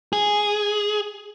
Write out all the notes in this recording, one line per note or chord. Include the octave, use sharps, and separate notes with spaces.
G#4